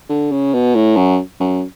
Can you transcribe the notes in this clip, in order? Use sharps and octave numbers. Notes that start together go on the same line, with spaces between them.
D3
C#3
B2
A2
F#2
F#2